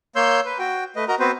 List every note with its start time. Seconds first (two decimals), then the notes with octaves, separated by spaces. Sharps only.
0.16 A#3 C#5 C6 E6 G6
0.45 B4
0.59 F#4 G5
0.96 A3 B4 D#5
1.08 F#4 A#4 D#5 A#5
1.19 B3 C4 F#4 B4 C5